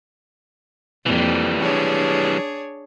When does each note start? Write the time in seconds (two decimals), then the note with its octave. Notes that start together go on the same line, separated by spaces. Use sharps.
1.06 F2 E3 G3 A#3
1.62 D4 G#4 C#5